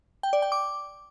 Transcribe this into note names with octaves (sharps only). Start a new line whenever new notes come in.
G5
D5
G5
D6